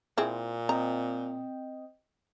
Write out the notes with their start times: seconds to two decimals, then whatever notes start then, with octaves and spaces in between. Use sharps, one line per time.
0.18 A#2 C4 E4 G#4
0.69 C4 D#5 G5 A#5